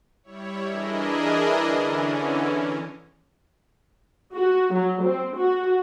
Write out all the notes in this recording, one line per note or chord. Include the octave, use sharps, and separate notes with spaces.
G3 E4 C#5
E3 D4 E4 G#4 A#4 D#5
D3 E3 C#4
F#4
F#3
C4
F#4